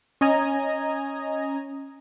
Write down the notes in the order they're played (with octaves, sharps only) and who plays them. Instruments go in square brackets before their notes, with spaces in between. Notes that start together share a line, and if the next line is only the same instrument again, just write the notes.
[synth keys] C#4 D#5 G#5 A#5